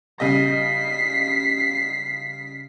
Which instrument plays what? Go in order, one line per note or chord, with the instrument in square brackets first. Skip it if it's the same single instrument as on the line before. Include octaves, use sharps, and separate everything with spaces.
[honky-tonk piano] C#3 G3 D#5 [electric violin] B6 C7